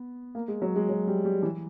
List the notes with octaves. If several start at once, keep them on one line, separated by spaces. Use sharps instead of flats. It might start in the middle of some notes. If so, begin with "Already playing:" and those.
Already playing: B3
A#3
G#3
F#3
G#3
F#3
G3
G3
E3